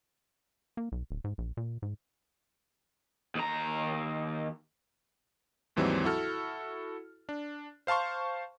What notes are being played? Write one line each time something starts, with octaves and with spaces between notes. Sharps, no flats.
A#3
B1
D1
G#2
A#1
A#2
G#2
D#2 A#5
D#2 G#2 E3 F#3 G3 C4
E4 F#4 A4 F6
D4
C5 F5 A5 C6 C#6